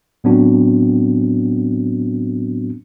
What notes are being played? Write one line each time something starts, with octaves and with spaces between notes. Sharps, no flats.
A2 F#3 B3 C4 D4 F#4